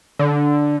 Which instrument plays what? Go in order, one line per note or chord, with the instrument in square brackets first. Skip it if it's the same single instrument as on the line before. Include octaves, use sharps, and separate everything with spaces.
[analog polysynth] D3